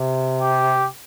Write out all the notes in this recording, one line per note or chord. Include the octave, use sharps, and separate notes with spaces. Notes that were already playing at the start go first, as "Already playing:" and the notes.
Already playing: C3
G4